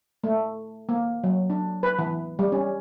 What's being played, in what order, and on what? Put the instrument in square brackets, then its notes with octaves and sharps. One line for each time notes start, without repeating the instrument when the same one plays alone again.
[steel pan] A3
A#3
F#3
D4
B4
E3
G3
C#4